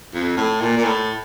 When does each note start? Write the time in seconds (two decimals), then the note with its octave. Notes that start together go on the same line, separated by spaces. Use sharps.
0.14 F2
0.37 A2
0.61 A#2
0.77 A#2
0.85 A2